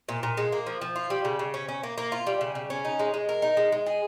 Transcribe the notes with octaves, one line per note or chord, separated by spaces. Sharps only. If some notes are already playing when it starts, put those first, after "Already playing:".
A#2
A#2
G#3
A#3
F3
F3
F4
G3
C#3
C#3
C#4
C#4
A#3
A#3
F4
G3
C#3
C#3
C#4
D#4
G#3
G#3
A#4
D#4
G#3
G#3
G#4